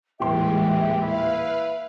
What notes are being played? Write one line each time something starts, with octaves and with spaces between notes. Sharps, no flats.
D#1 A2 E3 G#3 G4 E5 C6
E4 B4 F5